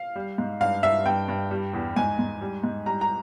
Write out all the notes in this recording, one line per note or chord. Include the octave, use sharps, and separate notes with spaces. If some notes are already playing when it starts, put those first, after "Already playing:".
Already playing: F5
G3
G#2
G2 F5
G2 E5
G2 G5
G2
G3
E2
G#2 G#5
G#2
G3
G#2
G3 A#5
A#5